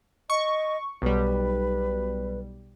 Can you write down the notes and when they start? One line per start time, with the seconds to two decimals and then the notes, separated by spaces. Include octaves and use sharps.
0.30 D#5 C#6
1.02 B1 G3 B4